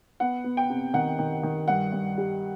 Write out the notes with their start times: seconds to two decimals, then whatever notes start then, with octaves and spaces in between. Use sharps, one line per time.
0.20 B3 F#5
0.44 B3
0.57 G5
0.70 C3
0.94 D#3 F#5
1.19 D#3
1.43 D#3
1.68 G2 F#5
1.92 G2
2.18 G3